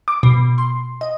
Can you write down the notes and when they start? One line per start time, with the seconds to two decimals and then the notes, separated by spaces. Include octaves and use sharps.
0.08 D6
0.23 B2
0.58 C6
1.01 D#5